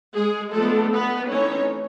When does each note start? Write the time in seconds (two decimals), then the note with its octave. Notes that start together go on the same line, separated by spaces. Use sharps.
0.16 G#3 G#4
0.54 F3 G#3 A3 B3 D4 A4
0.92 B3 B4
1.29 E3 A3 C4 C#4 D#4 C#5